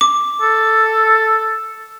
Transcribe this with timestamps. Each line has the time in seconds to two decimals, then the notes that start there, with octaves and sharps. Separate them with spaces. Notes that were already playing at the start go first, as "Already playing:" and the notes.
0.01 D6
0.42 A4